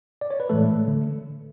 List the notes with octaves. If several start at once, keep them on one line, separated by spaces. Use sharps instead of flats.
D5
C#5
B4
A2 E3 G#3 A3 A4
D3 A3